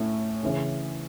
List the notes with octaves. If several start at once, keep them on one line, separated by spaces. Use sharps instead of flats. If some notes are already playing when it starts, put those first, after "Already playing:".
Already playing: A2 A3 C#4
C#3 E3 C#4